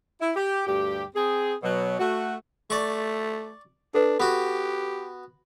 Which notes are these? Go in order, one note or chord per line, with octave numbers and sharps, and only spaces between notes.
E4
G4
D2 G2 G4
C4 G#4
B2 F#3
A3 F#4
A3 D5 C#6
D4 A4 B4
B3 F#4 G4